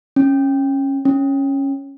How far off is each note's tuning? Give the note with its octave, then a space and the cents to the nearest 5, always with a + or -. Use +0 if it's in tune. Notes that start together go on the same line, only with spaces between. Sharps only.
C#4 -15
C#4 -10